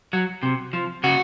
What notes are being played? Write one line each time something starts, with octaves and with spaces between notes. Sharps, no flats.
F#3
C3
F3
C#3 F#4